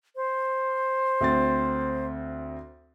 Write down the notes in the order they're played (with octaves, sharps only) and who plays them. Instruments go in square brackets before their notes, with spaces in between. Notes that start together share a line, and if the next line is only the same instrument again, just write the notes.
[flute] C5
[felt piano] D2 C4 A6